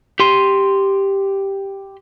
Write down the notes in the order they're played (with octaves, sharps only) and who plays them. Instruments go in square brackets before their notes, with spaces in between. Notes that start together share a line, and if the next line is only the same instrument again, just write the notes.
[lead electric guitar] G4 C6